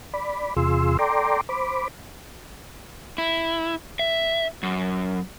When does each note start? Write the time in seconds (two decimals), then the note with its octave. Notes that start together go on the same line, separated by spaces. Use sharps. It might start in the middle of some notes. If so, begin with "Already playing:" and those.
0.14 D5 B5
0.57 E2 C3 F4 G#4 C6 E6
0.99 A4 D5 G5 A#5 C6 D6
1.49 C5 B5 D6
3.18 E4
3.99 E5
4.63 F#2